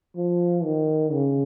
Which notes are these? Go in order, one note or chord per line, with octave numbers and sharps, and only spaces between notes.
F3
D#3
C#3